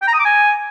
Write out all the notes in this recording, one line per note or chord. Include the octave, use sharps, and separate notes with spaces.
G5
A#5
D#6
D6
G#5